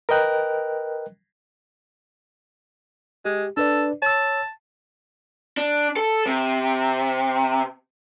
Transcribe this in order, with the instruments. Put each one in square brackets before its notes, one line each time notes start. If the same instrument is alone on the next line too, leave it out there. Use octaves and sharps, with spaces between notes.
[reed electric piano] A#4 B4 D#5 G5 F#6
[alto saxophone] G#3 [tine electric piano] G4
[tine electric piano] D4 B4 D5 [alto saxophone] A4
[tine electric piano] C#5 E6 [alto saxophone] A5
[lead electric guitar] D4
A4
C3